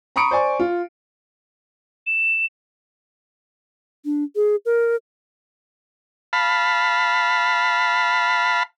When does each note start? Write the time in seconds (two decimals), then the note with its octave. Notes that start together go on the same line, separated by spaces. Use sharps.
0.16 A#5 B5 C#6 D#6 C#7 D7
0.31 C5 D5 G#5 C#6
0.60 F4
2.07 E7
4.05 D4
4.36 G#4
4.66 A#4
6.33 F5 A5 B5